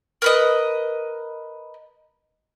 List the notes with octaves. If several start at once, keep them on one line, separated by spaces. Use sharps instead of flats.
A#4 B4 D#5